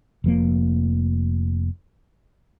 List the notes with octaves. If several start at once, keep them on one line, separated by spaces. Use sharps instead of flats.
F1 F3 A#3